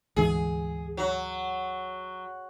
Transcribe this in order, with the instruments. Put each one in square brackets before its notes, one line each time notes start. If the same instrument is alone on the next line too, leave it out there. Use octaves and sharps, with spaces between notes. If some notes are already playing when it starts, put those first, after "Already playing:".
[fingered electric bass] D2 G#2 E3 [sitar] G#4
[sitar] F#3